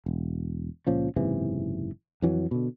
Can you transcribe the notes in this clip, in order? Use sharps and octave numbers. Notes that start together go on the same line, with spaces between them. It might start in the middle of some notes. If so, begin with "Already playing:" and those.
E1
C#2 A#2 F3 C#4
F#1 G#2 C3 E3
F2 E3 F#3
B2 D3